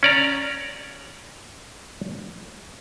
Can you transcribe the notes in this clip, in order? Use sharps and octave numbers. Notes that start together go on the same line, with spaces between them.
C#4 D5 A#5